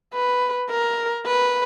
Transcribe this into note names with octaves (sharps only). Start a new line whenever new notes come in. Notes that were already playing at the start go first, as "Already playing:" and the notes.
B4
A#4
B4